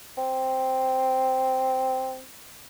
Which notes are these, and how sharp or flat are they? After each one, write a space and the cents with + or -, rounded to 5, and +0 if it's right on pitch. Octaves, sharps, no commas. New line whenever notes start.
C4 -5